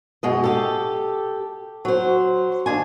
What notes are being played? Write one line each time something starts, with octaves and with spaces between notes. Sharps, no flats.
F#2 B2 G#3 D#5
G4 A4
F#3 C5
D#2 D4 G#5